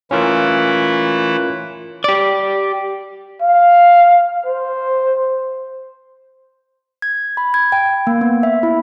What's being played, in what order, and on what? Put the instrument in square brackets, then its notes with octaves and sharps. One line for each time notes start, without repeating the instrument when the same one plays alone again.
[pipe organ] E3 A3 E4 [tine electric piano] C#4 F4 A#4
[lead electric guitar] G4 D5
[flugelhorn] F5
C5
[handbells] G#6
B5
G#6
G5
A#3
B3
E5
E4